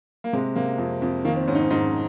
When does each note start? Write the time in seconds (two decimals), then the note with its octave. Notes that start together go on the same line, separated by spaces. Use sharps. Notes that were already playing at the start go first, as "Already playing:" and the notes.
0.24 A#3
0.33 C3 G#3
0.55 C3 A#3
0.78 F2
1.02 F2
1.25 D#3 A#3
1.36 C4
1.48 G#2 C#4
1.55 D#4
1.60 C#4
1.71 G#2 D#4